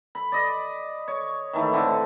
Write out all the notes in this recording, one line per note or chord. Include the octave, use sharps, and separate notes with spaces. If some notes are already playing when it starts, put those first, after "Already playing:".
B5
D5 D#5
C#5
D#3 E3 A3
A2 D3 C4 D6